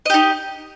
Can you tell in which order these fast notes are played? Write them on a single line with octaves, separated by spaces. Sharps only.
D#5 G4 D#4